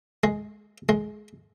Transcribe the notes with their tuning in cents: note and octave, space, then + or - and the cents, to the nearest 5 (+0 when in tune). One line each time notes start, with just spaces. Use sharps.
G#3 +10
G#3 +20